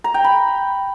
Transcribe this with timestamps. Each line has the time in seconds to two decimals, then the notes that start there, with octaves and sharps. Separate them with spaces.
0.04 A#5
0.14 G5
0.24 B5